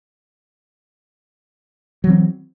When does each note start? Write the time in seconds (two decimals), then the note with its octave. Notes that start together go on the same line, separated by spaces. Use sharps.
2.04 F#3
2.07 E3
2.10 C4